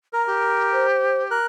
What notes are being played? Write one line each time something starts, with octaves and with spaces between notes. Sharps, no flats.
A#4 A#5
G4
C5
A#4 F#6